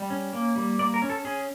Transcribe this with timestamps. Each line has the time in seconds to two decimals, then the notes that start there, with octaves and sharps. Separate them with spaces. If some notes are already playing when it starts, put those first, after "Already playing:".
Already playing: G3
0.10 C#4
0.33 A#3
0.56 G3
0.79 A#3 D5
0.94 A#4
1.02 C#4
1.10 A4
1.25 C#4 G#4